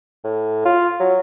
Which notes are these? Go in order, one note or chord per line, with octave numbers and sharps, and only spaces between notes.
A2
F4
F#3